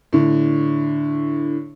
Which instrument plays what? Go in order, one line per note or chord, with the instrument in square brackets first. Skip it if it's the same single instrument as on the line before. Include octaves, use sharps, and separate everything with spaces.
[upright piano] A2 D3